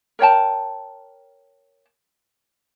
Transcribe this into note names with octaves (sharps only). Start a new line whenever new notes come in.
A#4 C#5 G5 A5